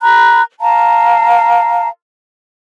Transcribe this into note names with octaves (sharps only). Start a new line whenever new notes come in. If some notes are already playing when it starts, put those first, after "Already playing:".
A#5 B5 F#6
F5 A5 A#5